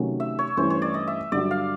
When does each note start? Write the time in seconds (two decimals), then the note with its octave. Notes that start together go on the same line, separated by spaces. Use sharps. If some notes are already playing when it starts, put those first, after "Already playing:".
Already playing: C3 D#3 F#3 A3 C#4
0.20 E5
0.39 C#5
0.57 G2 E3 A3 C#4 E4 C5
0.70 C#5
0.82 D5
0.94 D#5
1.07 E5
1.32 G2 D3 F#3 D5
1.51 F5